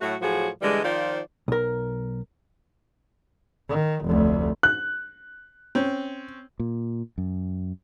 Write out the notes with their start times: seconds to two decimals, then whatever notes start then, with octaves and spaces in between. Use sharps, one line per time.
0.01 A2 F#3 A3 F#4
0.21 A2 F3 F#3 F#4 G#4
0.62 D3 E3 G3 G#3
0.84 D#3 F3 F4 C5 D5
1.48 B1 A#4
3.68 D#3
4.04 F1 D2
4.63 F#6
5.75 C4 C#4
6.60 A#2
7.18 F#2